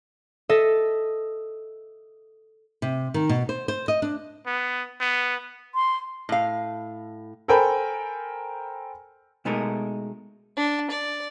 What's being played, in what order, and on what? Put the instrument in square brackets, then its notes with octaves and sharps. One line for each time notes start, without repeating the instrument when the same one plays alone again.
[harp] A4 D#5 E5
[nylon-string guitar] C3
D#3
B2
C5
C5
D#5
D4
[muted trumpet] B3
B3
[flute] C6
[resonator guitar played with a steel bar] A2 F5
[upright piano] A4 A#4 C5 G5 G#5 B5
[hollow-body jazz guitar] B2 G#3 A3 D#4 A4 A#4
[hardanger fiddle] D4
D5